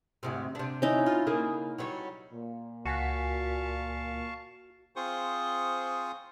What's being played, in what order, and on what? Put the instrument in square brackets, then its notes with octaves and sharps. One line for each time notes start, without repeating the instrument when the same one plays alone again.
[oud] D2 G#2 C3
C3 D4
[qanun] C#4 D#4 E4
[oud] F4
C#3 A#3 G#4
F#3 G3 C#5
[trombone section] A#2
[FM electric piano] C#2 G#5 B6 [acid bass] F#4 [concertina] F5 A5 C#6
[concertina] C4 F4 G#4 C5 C#6 D#6